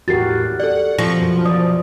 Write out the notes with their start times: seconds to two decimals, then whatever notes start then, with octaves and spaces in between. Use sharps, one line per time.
0.08 E2 A2 F#4 G4 A#4 A6 C7
0.60 A4 D5 F#5
0.98 F3 C4 C#6 A#6
1.17 F#2 B2
1.46 E3 D5 D#6